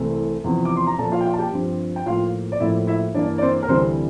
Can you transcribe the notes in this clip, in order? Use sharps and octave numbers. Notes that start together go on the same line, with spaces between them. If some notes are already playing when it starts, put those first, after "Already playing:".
Already playing: C2 C3 E3 A3 C4
E2 C3 F3
D6
C6
A#5
A#2 F3 A#3 A4 A5
F4 F5
G5
F4 F5
A5
G4 G5
G2 F3 C4
G5
A2 F3 A#3 F4 F5
D5
A2 F3 A#3 E4 E5
E4 E5
G2 E3 A#3 D4 D5
D5
C4 C5
A#4
D2 C3 E3 G3 C4 C5